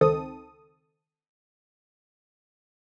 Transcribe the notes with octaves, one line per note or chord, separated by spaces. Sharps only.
C#2 D#3 C4 A4 D#6